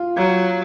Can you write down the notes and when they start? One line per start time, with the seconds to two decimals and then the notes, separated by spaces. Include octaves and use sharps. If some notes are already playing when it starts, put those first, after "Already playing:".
Already playing: F4
0.17 F#3 F4